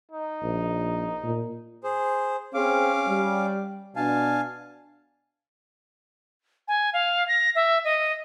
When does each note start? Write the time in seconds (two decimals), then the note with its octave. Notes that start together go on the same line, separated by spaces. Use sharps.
0.12 D#4
0.43 A#1
1.24 A#2
1.84 G#4 C5
2.54 C4 C#4 G#4 F5 D6
3.07 G3
3.96 B2 D4 F5 G#5 A5
6.68 G#5
6.93 F5
7.28 A#6
7.55 E5
7.85 D#5